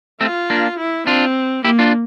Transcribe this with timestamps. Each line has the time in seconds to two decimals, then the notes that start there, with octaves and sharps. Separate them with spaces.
0.21 A3 C4 F4
0.50 A#3 D4
0.78 E4
1.07 C4 D4 F4
1.65 A#3 E4 G4
1.79 D4 F4